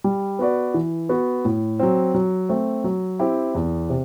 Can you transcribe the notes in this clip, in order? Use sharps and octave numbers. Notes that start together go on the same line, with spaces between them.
G3
B3 F#4 B4 D5
E3
B3 F#4
A2
F#3 C4
F#3
A3 C4
F#3
C4 E4 G4
E2
C3